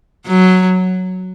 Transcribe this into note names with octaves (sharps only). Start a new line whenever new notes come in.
F#3